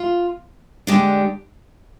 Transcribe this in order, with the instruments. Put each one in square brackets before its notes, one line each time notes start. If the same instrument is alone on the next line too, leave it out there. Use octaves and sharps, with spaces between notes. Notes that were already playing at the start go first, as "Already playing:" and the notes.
Already playing: [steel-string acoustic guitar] F4
D3 G#3 D4 G4 D5